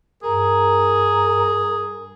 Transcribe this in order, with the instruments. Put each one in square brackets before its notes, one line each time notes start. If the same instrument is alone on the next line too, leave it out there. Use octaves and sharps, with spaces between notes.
[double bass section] G2 [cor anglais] G#4 [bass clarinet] A#4